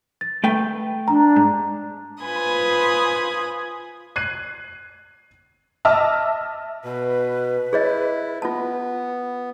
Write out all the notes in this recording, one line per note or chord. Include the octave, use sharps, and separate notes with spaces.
A6
A3 B4 G5
D4 A#5
G#2
F4 B4 C5 G#5 B5 D#6
F#6 G#6 C7 D#7
D#5 E5 A5 D6 E6 F6
B2 B4
E4 G#4 C#5 D#5
B3 F4 A5